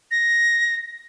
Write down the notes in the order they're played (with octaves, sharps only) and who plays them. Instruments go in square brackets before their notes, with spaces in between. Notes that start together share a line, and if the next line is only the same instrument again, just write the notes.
[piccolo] A#6